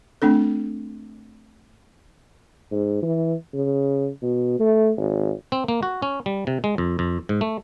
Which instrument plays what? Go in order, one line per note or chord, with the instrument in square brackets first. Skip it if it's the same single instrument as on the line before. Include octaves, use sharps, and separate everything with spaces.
[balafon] A3 C4 D4 A4
[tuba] G#2
E3
C#3
B2
A3
G#1
[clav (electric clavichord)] C4
A#3
F#4
C#4
G3
C3
G#3
F2
F2
G#2
A3